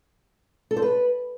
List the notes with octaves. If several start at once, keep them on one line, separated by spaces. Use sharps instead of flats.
A4
C5
B4